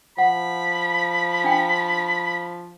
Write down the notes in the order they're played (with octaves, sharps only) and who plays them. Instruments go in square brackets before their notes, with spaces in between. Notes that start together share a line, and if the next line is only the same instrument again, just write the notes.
[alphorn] F3 [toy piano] F#5 [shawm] B5
[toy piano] D4 G5